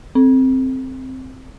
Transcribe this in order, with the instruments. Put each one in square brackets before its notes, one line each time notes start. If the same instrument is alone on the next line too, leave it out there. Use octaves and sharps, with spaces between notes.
[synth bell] C4